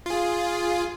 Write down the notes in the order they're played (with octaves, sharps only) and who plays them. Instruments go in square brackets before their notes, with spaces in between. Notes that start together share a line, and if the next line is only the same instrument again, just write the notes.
[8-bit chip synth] F4 G#4